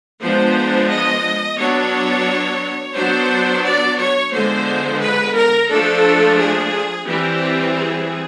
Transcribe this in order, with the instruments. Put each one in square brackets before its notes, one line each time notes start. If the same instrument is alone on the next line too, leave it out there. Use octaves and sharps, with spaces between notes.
[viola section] F3 G#3 B3 D4 C5
D#5
F#3 B3 D4 C#5
F#3 B3 D4 C5
D5
C#5
D3 F3 G#3 B3 C5
B4
A#4
F3 A3 D4 A4
G#4
E3 G3 C4 G4
G#4